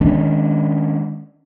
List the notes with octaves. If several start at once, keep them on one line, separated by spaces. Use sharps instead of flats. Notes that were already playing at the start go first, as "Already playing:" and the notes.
D#3 G#3 C#4 D4